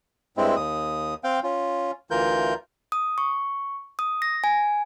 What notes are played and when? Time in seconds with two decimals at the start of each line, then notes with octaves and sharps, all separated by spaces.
0.37 G2 G#3 C4 E4
0.56 D#2 D#6
1.24 C4 F5 G5
1.44 C#4 F4
2.11 D2 E3 F4 A#4 G6
2.92 D#6
3.18 C#6
3.99 D#6
4.22 A#6
4.44 G#5